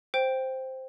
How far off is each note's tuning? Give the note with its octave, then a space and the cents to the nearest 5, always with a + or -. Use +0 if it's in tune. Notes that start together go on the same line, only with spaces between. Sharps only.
C5 +0 G5 +0